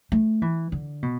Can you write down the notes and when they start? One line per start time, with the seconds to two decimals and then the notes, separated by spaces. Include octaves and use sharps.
0.12 A3
0.42 E3
0.72 D3
1.03 B2